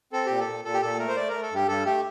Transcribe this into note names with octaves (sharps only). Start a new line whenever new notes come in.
C4 A4
A#2 G4
A4
A#2
A#2 A4
G4
A#2 A4
A3 A#4
C5
A3 D5
A3 A#4
A4
G2 G4
G2 A4
A3 G4